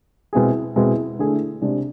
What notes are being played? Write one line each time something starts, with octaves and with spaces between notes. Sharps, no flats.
B2 G#3 C4 E4 G#4
B2 G#3 C4 E4 G#4
D3 A3 E4 G#4
C3 G#3 D4